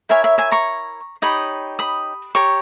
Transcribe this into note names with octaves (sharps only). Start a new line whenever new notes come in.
E4 A#4 C#5 E5 G#5
E5
E5 G#5
A#5 C#6
D#4 G4 C#5 B5 D#6
B5 D#6
G4 C#5 A#5 C#6